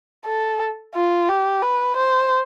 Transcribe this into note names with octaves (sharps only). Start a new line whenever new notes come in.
A4
F4
G4
B4
C5